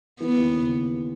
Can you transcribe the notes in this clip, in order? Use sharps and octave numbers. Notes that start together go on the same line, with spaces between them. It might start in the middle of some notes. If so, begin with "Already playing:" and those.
E3 B3
D#2
C#3